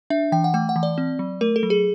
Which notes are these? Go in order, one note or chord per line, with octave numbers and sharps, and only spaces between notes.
D4 E5
E3 G5
F#5
A3 G5
F#5
E3
D5
C4
F#3
A3 A#4
A4
F#3
G#4